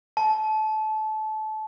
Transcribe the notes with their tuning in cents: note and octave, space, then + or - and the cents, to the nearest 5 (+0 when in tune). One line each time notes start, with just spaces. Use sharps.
A5 -25